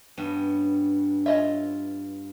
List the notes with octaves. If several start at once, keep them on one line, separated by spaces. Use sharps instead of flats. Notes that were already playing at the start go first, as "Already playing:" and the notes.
G2 B3 C#4
C#4 F4 D#5 E5